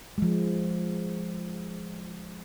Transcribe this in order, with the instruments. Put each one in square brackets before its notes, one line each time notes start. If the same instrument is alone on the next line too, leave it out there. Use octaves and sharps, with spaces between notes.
[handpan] F3 G#3